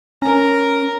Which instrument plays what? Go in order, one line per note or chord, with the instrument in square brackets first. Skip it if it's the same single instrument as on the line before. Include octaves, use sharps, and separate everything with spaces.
[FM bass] C#4 [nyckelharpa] A#4 A#5